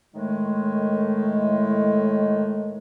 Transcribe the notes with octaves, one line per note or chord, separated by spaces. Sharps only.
A2 D#3 G#3 A3